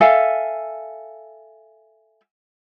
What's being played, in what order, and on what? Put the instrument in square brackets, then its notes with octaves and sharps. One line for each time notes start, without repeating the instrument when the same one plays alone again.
[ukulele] A4 E5 F5 G#5